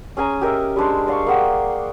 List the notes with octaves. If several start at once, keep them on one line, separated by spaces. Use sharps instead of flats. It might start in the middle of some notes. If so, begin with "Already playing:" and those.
C#4 G#4 G#5 A#5
G4 A#4 D#5 E5
G3 G#3 D4 C5
D5 F5 C6 C#6
A#3 G#4 F#5 G5